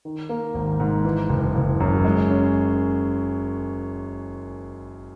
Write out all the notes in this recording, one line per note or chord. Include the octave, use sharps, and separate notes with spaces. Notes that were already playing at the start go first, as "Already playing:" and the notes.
D#3
A#3
G#1
G#2
E3
F#1
F#1
F#2
G#3
C#4